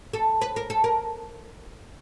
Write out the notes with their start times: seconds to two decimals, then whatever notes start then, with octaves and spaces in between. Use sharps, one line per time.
0.13 A4
0.41 B4
0.56 A#4
0.70 A4
0.84 A#4